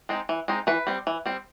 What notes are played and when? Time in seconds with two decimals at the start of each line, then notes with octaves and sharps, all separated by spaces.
0.09 G#3 C4 D#4
0.29 E3
0.48 G#3 C4 D#4
0.67 E3 B4
0.87 G3 C4
1.07 E3
1.26 G3 C4